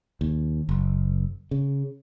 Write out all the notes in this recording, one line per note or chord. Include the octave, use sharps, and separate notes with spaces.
D#2
F#1
C#3